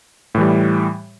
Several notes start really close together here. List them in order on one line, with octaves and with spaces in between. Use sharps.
A2 E3 G3